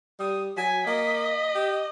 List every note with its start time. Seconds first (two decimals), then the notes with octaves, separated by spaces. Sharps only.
0.19 G3 D#6
0.57 F#3 G#5 B6
0.87 A#3 D#5
1.55 G4